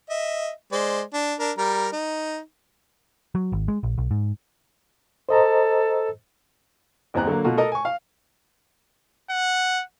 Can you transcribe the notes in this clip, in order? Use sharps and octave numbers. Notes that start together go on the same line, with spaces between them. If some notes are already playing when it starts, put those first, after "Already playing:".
D#5 E5
G#3 C5 D5
D4
D4 A#4
G3 A#4 A#5
D#4
F#3
G#1
G#3
A#1
B1
G#2
A4 C5 D#5 A#5
A1 E2 C4 A#5 F#6
D3 F#3 A#3
B2 A3 F4 F#4
A4 A#4 D#5 A#5
G#5 C#6
F5
F#5